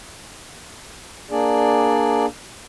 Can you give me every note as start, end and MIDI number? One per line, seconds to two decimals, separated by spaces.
1.31 2.26 58
1.31 2.26 62
1.31 2.26 68
1.31 2.26 74